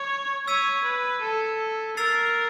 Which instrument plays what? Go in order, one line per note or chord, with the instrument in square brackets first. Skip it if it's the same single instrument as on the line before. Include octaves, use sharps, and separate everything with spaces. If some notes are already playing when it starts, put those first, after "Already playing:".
Already playing: [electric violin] C#5
[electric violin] C#5 [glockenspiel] E6 G#6 B6 D#7
[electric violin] B4
A4
[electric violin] A#4 [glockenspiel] E6 A6 C7 F7